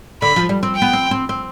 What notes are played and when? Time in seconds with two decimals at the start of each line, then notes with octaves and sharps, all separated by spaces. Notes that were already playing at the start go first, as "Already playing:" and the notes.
0.22 D3 B5
0.36 F3
0.49 G3
0.63 C4
0.76 G5
0.82 B3
0.93 C4
1.11 C4
1.29 C4